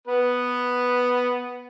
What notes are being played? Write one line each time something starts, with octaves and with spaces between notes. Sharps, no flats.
B3 B4